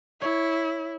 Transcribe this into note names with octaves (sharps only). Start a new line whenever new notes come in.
E4 C#5